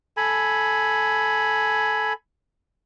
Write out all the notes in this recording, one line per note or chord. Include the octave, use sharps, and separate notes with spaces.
A4 G#5 B5